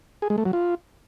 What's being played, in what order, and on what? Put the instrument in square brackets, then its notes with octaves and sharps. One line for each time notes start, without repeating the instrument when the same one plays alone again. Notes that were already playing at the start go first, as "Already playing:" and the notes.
[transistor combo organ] G#4
G#3
A3
F#3
F4